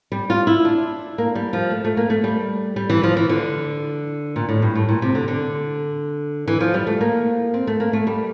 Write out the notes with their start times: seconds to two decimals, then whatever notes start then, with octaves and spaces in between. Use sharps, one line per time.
0.12 G3
0.30 F4
0.47 E4
0.65 D4
1.18 A#3
1.35 G3
1.53 F3
1.70 A3
1.85 A3
1.97 A#3
2.10 A3
2.24 G3
2.76 G3
2.90 E3
3.03 F3
3.17 E3
3.29 D3
4.36 A#2
4.49 A2
4.62 G2
4.75 A2
4.89 A#2
5.02 C3
5.15 D3
5.28 D3
6.48 E3
6.60 F3
6.74 G3
6.87 A3
7.01 A#3
7.54 C4
7.67 A3
7.80 A#3
7.93 A3
8.07 G3